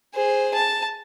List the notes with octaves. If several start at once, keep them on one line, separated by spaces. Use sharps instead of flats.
G#4 C5
A5